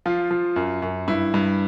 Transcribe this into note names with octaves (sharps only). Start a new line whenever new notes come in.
F3 F4
F3
F#2
F#2
G2 E4
G2